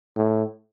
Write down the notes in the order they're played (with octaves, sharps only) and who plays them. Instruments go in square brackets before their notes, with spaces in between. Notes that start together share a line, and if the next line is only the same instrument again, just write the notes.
[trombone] A2